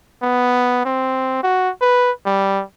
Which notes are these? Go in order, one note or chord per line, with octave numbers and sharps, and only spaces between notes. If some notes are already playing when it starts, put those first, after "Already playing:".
B3
C4
F#4
B4
G3